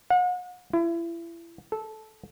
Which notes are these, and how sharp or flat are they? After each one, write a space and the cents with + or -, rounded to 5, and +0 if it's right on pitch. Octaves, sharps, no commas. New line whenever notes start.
F#5 -40
E4 +35
A4 -10